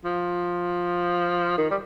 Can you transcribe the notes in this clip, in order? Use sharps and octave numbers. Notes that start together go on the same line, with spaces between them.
F3
D#3
G3